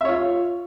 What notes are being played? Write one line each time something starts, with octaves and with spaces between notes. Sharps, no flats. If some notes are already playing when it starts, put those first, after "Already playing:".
F4 C#5 E5